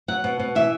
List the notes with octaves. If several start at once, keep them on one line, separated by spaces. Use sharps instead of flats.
F#3 F#5
B2
B2
E3 E5